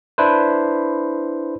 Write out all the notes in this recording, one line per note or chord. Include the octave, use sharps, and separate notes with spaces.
D4 E4 B4 C5